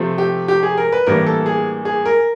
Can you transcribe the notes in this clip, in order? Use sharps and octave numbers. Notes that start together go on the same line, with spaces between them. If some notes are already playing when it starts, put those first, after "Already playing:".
Already playing: C3 F3 A3 C4
G4
G4
G#4
A#4
B4
A2 E3 G3 A#3 D4 A#4
A4
G#4
G#4
A#4